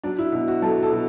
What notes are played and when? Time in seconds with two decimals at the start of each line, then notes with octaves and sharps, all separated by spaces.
0.04 F#3 D4
0.19 E4
0.32 B2 E4
0.48 F#4
0.62 F#3 A4
0.83 A4
0.91 B2 F#4